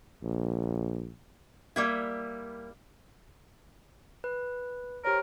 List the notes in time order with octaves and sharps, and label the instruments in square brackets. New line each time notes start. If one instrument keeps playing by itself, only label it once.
[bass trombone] A#1
[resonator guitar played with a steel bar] G3 A#3 E4
[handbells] B4
[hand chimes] G4 C5 C#5 [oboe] A#4